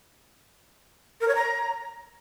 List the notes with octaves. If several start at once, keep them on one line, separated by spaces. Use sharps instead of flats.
A#4
C#5
A#5